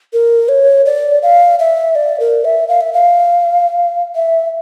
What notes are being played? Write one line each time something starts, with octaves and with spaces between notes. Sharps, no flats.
A#4
C#5
D5
F5
E5
D5
A#4
E5
F5
E5
F5
E5